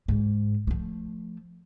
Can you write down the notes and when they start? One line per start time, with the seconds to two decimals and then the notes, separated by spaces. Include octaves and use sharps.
0.08 G#2
0.67 F3 A3